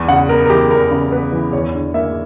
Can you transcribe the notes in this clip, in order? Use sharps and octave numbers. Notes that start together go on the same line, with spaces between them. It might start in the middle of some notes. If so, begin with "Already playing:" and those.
Already playing: E2
C#3 F#5
B3 A#4
A#4
E3 G4
E2 A#4
C#3
B3 B4
E3
E2 C#5
D3
A#3 E5